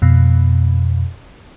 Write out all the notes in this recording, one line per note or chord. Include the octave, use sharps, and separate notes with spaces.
F2 B2